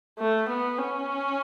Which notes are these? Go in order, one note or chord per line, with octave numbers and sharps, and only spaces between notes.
A3
B3
C#4